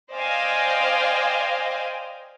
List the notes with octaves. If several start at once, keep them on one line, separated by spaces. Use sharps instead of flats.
C5 D5 D#5 F5 G5 G#5